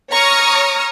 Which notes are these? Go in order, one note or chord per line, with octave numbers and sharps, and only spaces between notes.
C#5 A#5 C#6 D#6 F6